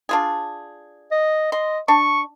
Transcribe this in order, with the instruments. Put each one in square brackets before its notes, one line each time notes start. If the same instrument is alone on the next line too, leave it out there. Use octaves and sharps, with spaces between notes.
[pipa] D4 F4 G#4
[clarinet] D#5
[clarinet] D#5 [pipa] C6
[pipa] D4 [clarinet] C#6